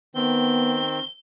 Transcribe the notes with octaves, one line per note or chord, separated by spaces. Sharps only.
D#3 B3 C4 G7